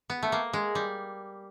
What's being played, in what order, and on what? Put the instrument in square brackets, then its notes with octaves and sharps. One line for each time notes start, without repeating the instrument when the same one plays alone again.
[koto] B3
A3
A#3
G#3
G3